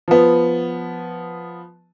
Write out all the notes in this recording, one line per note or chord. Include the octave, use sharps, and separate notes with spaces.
F3 B3